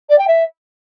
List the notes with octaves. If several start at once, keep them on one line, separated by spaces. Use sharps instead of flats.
D5
G5
E5